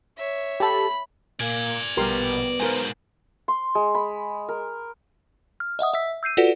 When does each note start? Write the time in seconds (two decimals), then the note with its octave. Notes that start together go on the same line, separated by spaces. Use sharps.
0.17 C#5 E5
0.60 G4 A4 B5
1.40 A#2 A#3 D5 G#5
1.97 A#1 B2 G3 B3 G4 A#4 C6
2.60 G#2 B2 A#4 C5 G#5
3.48 C6
3.75 G#3
3.95 B5
4.48 A#4
5.60 F6
5.79 D#5 E5 F#5 D#6
5.94 E5 E6 B6
6.23 E6 G6 C7 D#7
6.37 F4 F#4 A4 B4 D5 F#5